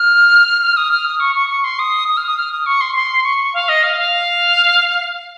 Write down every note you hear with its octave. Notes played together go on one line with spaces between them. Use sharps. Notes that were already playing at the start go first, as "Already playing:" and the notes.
Already playing: F6
F6
D#6
F6
D#6
C#6
C#6
C#6
C6
D#6
D#6
F6
D#6
F6
D#6
C#6
C6
C6
C#6
F5
D#5
F5
F5